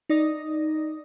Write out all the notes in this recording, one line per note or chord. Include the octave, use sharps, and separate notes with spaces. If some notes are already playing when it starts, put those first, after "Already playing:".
D#4 D5 D#6 A#6